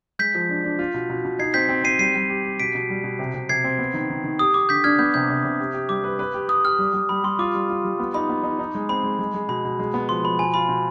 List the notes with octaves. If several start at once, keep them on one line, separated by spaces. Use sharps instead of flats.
G#3 G6 B6
F3
D4
D4
F4
B2
B2
B2
D#4 G#6 C7
C4 G6 B6
C4
C4 C7 D#7
G3 C7 D#7
G3
G4
G4
B2 B6 D7
B2
G3
B2
C3
C3
C3 G#6 C7
C4
B3
D#3
D#3
D#3
G4 D#6
G4 D6
D3 G6 B6
D4 F6 G#6
B3 G6
C3 G6
C3
C3
G4
G4
G3 D6
B4
B4
G4
G4 D#6
G4 F6
G3
G3
G3 B5
G3 C6
F4 D6
G3
F4
G3
B3
D#4 B5
B3
D#4
D#4
G#3
C4 B5
G#3
G#3
G#3
B2 B5
B2
G#3
B3
F3 C6
F3 B5
B2 G#5
F4 B5
B2